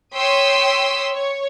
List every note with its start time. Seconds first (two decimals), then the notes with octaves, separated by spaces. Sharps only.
0.15 C#5 G5 C6 D#6 E6 B6
1.13 C#5